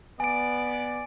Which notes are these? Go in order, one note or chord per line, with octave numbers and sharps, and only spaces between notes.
B3 D5 G#5 D7